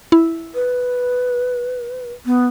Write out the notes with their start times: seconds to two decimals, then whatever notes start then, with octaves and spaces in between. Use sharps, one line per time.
0.12 E4
0.55 B4
2.26 B3